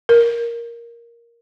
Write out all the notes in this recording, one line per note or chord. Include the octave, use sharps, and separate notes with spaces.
A#4